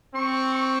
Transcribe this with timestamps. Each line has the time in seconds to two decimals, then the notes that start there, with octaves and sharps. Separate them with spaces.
0.15 C4 C#6
0.54 C#6